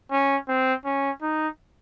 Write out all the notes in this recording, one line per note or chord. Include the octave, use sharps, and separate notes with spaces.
C#4
C4
C#4
D#4